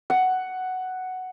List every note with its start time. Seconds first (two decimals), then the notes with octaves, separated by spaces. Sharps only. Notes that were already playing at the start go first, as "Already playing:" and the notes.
0.10 F#5